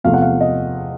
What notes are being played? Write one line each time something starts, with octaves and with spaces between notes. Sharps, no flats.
E2 C3 F3 A3 F5
F#5
F5
D#5